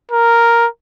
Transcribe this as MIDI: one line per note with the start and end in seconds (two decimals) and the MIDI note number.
0.11 0.67 70